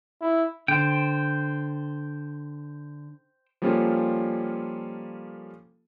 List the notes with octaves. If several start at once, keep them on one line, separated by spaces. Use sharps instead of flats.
E4
D3 C5 G5
F3 G3 A#3 C#4 F4 A4